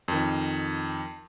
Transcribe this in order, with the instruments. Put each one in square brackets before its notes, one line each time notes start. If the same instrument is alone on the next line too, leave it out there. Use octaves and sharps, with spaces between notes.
[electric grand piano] F2 D#3